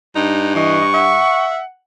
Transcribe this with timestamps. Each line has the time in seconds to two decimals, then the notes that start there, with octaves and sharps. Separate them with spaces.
0.15 G2 D#4
0.55 E3 D#5 C#6
0.94 E5 F#5